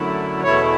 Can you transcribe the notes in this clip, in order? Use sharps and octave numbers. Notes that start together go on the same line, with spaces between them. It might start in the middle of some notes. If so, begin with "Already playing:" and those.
Already playing: F#2 D3 F#3 A3 E4
E2 B2 A3 E4 C#5